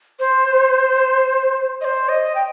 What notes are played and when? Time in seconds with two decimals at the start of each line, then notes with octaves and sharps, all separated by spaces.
0.19 C5
1.81 D#5
1.85 C5
2.09 D#5
2.35 G5